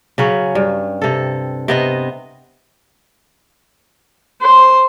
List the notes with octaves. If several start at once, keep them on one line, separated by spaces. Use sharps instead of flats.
C#3 F#3 C#4
G2
C3 A4
C3 B3 D#5
C5